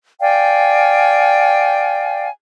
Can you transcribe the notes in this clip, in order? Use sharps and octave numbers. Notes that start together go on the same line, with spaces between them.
D5 F5 G5 G#5